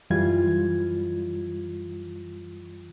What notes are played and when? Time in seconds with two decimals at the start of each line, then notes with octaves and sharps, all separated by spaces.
0.10 F#2 E3 G3 F4 G#6